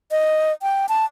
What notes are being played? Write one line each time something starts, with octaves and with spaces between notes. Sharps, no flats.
D#5
G5
A5